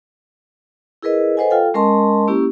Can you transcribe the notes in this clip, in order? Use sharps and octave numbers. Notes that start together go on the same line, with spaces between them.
E4 G#4 A#4 B4 D#5
A4 B4 C5 D#5 F#5 G#5
F4 A4 F5 G5
G#3 C#4 A#4 D#5 A5 C6
A#3 C#4 E4 G4